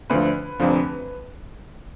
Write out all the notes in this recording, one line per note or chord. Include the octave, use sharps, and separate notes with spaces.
D2 D3 F3 B4
F1 F2 D3 F3